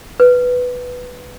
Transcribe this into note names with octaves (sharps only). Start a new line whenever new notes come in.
B4